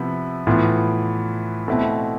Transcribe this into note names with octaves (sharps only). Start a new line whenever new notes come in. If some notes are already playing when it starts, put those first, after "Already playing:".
Already playing: C3 F3 B3 E4
A2 E3 B3 F4
B2 A3 C4 E4